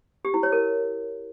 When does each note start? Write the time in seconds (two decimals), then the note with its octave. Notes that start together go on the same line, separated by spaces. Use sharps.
0.25 G4
0.34 E4
0.43 C#5
0.52 A#4